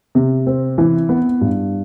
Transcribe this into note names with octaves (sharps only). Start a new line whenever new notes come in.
C3
C4
E3
B3
G2